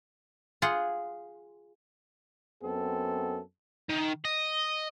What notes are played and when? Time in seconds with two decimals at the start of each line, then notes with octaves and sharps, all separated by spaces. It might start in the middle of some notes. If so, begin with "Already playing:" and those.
0.62 F4 G#4 F#5 C6
2.62 F#2 B3 C4 A4
3.89 D#3
4.25 D#5